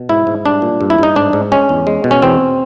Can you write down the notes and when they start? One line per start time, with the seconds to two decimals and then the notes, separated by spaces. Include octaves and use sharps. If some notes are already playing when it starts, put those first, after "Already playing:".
Already playing: B2
0.09 G#2 E4
0.27 G#2
0.45 G3 D4
0.62 A#2
0.81 G2
0.90 E4
0.99 G2 D#4
1.16 G#2 D4
1.33 G#2
1.52 G#3 C#4
1.69 E2
1.87 G#3
2.04 B2
2.11 C#4
2.22 E2 C4